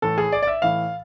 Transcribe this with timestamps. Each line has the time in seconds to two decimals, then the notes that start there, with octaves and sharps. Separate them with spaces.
0.02 A2 E3 A4
0.18 G#4
0.32 D5
0.43 D5
0.47 E5
0.62 A2 E3 F5